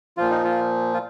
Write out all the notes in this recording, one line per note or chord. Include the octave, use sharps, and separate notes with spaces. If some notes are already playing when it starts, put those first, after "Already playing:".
A#2 F3 F4
D#4
F4
F4